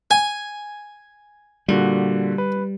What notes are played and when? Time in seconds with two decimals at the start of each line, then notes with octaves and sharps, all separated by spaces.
0.11 G#5
1.68 A#2 D3 G3 F#4
2.38 B4